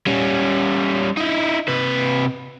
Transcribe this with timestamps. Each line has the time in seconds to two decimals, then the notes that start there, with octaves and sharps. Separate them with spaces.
0.07 G3 C#4
1.17 D#4 E4
1.68 C3 B4